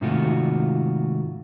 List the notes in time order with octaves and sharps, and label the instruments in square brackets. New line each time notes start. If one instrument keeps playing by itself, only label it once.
[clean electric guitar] G#2 C3 D#3 A3 F4 F#4